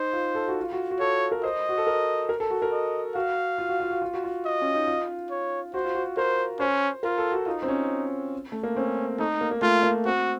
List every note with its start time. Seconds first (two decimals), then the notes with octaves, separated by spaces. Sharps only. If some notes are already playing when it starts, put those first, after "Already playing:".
Already playing: D#4 C5
0.13 F4
0.35 A4
0.48 F#4
0.61 F4
0.73 F#4
0.91 F#4
1.00 A4 C#5
1.32 A#4
1.43 C5 D#5
1.69 F#4
1.78 A4
1.87 A#4
2.29 A#4
2.40 A4
2.50 F#4
2.62 A#4
2.72 D#5
3.15 F#4 F5
3.58 F4
3.69 F#4
3.80 F4
3.91 F#4
4.02 F4
4.14 F#4
4.24 F4
4.45 D#5
4.61 C#4
4.75 D#4
4.87 F4
5.30 C#5
5.74 F#4 C5
5.85 F4
5.95 F#4
6.17 A#4 C5
6.60 C#4 C5
7.03 F4 A#4
7.18 A4
7.32 F#4
7.46 D#4 F4
7.62 C4
7.68 C#4
8.52 A3
8.63 A#3
8.76 C4 C#4
9.19 A3 D#4
9.41 A#3
9.51 A#3
9.62 A3 F4
9.83 A#3
10.05 C4 F#4